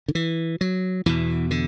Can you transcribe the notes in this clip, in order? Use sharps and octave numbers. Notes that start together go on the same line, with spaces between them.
D3
E3
F#3
E2 B2 E3
D3